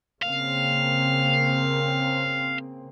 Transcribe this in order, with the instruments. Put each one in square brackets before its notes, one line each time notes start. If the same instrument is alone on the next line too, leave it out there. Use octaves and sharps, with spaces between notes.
[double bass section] C#3 A#3 C4 [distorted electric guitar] F5